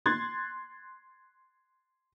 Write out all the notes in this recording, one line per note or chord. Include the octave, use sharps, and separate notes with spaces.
C6 F#6 G#6 A6